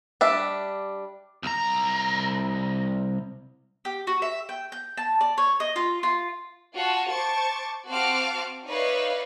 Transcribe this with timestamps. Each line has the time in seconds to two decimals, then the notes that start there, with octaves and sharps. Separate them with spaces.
0.21 G3 D4 E5
1.43 C2 A#5
3.85 G4
4.07 F#4
4.22 E5
4.49 G5
4.72 G6
4.97 A5
5.21 D5
5.38 C#5
5.60 D#5
5.76 F4
6.03 F4
6.75 F4 F#4 A5
7.09 C5 A5 C#6 D6 A6
7.88 C4 F#4 F5 A5 D6 F6
8.68 D#4 B4 C#5 D5 E5 F5